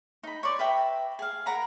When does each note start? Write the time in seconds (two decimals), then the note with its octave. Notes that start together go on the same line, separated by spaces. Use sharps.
0.23 D#4 B5
0.43 C#5 D5 C6
0.59 B4 E5 G5 A#5
1.19 G#4 F5
1.46 A#4 F#5 A#5 B5